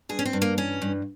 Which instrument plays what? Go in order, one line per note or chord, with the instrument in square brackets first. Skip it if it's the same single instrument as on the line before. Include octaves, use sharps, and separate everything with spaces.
[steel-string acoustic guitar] G2 G#4
C#4
C4
G2
A#3
E3 C#4
G2